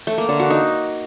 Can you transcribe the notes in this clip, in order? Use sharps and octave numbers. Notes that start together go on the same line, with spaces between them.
A3
A#3
D3
F#4
D#4